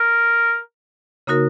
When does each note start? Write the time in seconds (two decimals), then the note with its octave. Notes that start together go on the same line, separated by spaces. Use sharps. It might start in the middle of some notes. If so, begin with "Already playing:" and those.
Already playing: A#4
1.27 C#3 A#3 D#4 F#4 A#4